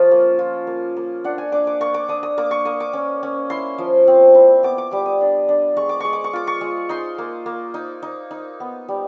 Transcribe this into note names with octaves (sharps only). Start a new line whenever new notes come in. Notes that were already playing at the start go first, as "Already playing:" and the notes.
Already playing: F3 C#4 F4
A#3
F4
A#3
A#3
D4 F#5
G#5
D4 D6
D6
A#3 C#6
D6
D4 D#6
D#6
A#3 D6
C#6
A#3 D#6
D6
C#4
C#4
E4 C6
F3
C4
E4
B3 D6
D6
G3 D6
D#6
D4
D4
G#3 C#6
D6
G#3 C#6
D6
C#6
F4 D6
C#6
G#3
D#4 C6
A#3
A#3
D#4
D#4
D#4
B3
G3